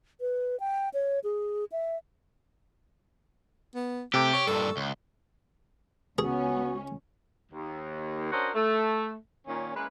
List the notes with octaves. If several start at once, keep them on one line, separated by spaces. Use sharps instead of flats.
B4
G5
C#5
G#4
E5
B3
C3 A3 G4 G5 D6
C#5 C#6
G2 A#2 A4
C#2
C#2 B3 C#4 F#4 G#4
D#2
C#4 D4 F#4 A#4 C5 D#5
A3
A#2 D#3 C#4
E3 G#3 A#3 C#4 B4